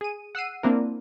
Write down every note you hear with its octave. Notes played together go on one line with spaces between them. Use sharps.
G#4 D#7
F#5 E6 C7 D#7
A#3 C4 D4 E4 A#4